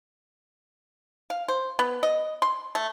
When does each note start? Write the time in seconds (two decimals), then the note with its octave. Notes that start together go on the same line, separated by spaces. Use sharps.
1.30 F5
1.48 C5
1.79 B3
2.03 D#5
2.42 C6
2.75 A3